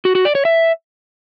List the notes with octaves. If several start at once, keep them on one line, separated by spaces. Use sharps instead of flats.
F#4
F#4
D5
C#5
E5